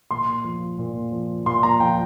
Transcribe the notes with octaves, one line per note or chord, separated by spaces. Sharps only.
A#2 C6
F3
A#2
F3
A#2 C6
A#5
F3 G5